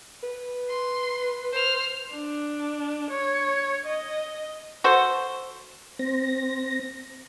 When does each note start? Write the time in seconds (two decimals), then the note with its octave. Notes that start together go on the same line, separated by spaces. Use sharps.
0.23 B4
0.69 C6
1.53 C5 F6
2.13 D4
3.10 C#5
3.86 D#5
4.84 F#4 A4 C5
5.99 C4 A#6